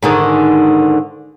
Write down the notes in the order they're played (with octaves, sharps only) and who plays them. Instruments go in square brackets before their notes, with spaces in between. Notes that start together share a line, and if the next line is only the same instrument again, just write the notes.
[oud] G#2 D3 D#3